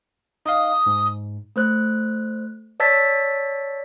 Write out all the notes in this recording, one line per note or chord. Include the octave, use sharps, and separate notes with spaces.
D#4 F5 D#6
G#2
A3 C5 F#6
C#5 D5 A5 E6 A6 B6